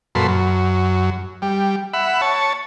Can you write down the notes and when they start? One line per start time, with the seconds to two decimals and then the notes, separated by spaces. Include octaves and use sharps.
0.15 F#2 A#2 A4 B4 C6
0.28 F#2
1.42 G3
1.93 E5 F#5 B5
2.21 C#5 A5